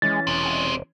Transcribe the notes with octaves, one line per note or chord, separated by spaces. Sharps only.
E3 G#3 C#4 C#5 A6
E1 C3 G#3